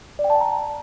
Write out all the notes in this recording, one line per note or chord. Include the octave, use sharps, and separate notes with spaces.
D5
G5
A5
G5
A#5